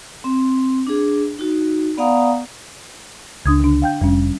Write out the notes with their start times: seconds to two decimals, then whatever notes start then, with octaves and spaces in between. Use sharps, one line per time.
0.24 C4
0.87 D4 G#4
1.39 D#4 F#4
1.98 B3 D5 F5 F#5 A#5 D#6
3.46 C#2 D4 D#6 G#6
3.60 D3 D4
3.82 F5 G5 G6
4.01 F1 G3 C#4